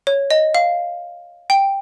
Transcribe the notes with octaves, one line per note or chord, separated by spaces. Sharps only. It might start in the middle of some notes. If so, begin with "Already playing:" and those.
C#5
D#5
F5
G5